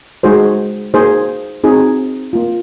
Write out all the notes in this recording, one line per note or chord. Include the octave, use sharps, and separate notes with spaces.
G#3 D#4 F#4 G#4 C5
A#3 D#4 F#4 G#4 C5
C4 D#4 F#4 G#4
A#3 F4